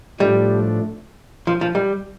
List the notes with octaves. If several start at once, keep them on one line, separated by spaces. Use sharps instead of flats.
A2 F3 G3 A3 D4
F3
F3
G3